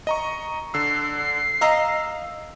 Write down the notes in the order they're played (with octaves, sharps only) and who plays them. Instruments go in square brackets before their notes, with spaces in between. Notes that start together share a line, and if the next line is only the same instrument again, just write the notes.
[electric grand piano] D#5 A#5 C#6
[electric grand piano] D3 E6 [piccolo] C7
[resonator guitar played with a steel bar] D#5 A#5 [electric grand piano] F5 E6